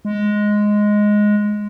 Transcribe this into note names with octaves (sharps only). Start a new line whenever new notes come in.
G#3